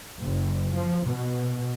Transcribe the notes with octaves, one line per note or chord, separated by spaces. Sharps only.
F#1
F3
B2